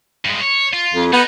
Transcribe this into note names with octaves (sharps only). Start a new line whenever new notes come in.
G2 G#3
C#5
F4
F2
B3 D#4